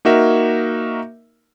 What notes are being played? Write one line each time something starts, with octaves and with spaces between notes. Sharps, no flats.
A#3 D#4 F#4 A#4 E5